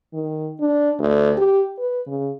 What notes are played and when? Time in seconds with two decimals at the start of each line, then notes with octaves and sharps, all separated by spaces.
0.13 D#3
0.60 D4
0.99 D2
1.37 G4
1.78 B4
2.07 C#3